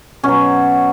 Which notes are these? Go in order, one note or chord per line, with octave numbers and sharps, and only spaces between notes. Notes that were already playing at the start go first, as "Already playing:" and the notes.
B2 F#3 C#4